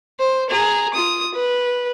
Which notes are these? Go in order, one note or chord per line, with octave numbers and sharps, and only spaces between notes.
C5
G#4 A#5
F4 D#6
B4